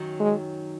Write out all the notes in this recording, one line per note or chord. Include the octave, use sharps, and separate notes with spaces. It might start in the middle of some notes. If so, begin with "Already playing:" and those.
Already playing: F#2 D#3 F#3
G#3